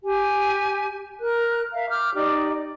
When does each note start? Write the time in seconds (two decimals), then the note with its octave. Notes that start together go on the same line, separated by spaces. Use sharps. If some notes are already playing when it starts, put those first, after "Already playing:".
0.04 G4 G#5
1.20 A#4 F#6
1.74 E5 F5 A#5
1.90 D6 F6 G6
2.14 D#4 G4 D5